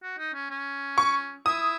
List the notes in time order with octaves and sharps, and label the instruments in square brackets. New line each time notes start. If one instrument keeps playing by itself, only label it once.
[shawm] F#4
D#4
C#4
C#4
[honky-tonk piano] C#6
[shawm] E4 [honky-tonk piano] D#6